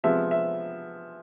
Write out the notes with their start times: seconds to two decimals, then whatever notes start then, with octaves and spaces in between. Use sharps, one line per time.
0.04 C3 F3 G#3 B3 E5
0.31 E5